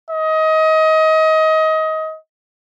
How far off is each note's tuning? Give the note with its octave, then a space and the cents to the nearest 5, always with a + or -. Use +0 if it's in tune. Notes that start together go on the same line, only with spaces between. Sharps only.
D#5 +25